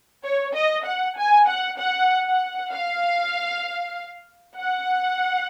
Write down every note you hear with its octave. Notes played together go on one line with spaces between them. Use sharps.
C#5
D#5
F#5
G#5
F#5
F#5
F#5
F5
F#5